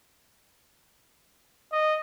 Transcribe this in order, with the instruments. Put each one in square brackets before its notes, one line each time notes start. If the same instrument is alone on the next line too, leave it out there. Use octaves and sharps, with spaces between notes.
[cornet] D#5